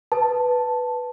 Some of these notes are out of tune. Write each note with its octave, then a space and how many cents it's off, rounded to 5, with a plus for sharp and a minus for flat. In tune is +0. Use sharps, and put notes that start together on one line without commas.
B4 +0 A5 +0